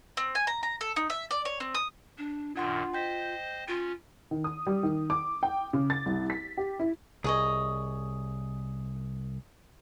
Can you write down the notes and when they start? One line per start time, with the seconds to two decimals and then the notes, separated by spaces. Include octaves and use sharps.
0.17 C4
0.35 G#5
0.47 A#5
0.63 A#5
0.81 A4
0.96 D#4
1.10 E5
1.31 D5
1.45 C#5
1.60 C4
1.75 D#6
2.18 D4
2.56 F#2 A#2 D#3 D4 F4 F#5 C6
2.94 C5 D#5 G5 G6 B6
3.68 C#4 F4
4.31 D#3
4.44 D#6
4.67 G3
4.83 D#3
5.10 D6
5.43 G5
5.73 C#3
5.90 A6
6.06 C2
6.30 B6
6.57 G4
6.80 E4
7.24 C2 G#4 C#5 D#5